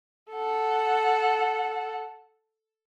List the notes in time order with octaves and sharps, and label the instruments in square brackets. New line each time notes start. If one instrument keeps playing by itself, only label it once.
[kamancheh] A4 F#5